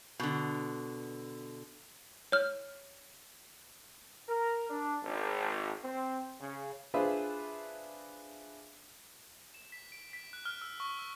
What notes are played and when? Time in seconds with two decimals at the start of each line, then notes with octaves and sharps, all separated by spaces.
0.20 B2 D3
2.32 C#5 F6
4.27 A#4
4.69 D4
5.03 G#1
5.82 C4
6.39 C#3
6.94 D4 F4 G#4 B4 C5 E5
9.54 E7
9.72 B6
9.92 D7
10.13 B6
10.33 F#6
10.45 F6
10.62 E6
10.80 C#6
10.99 E6